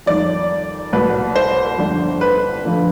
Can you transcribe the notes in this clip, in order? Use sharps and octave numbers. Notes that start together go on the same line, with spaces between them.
F2 D#3 G3 D5
C2 B2 G3 B4
C5
G1 F2 D3 G3
B4
F1 F2 D3 F3